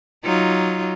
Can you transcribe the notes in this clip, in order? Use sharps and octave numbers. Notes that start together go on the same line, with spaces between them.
F#3 D#4 F4